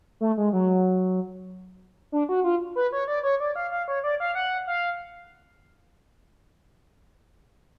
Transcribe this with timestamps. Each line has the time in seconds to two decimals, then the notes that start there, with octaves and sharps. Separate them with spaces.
0.21 A3
0.37 G#3
0.53 F#3
2.12 D4
2.29 F#4
2.44 F4
2.75 B4
2.92 C#5
3.08 D5
3.23 C#5
3.40 D5
3.56 F5
3.71 F5
3.88 C#5
4.04 D5
4.20 F5
4.35 F#5
4.67 F5